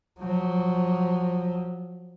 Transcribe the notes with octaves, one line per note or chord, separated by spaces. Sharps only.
F3 F#3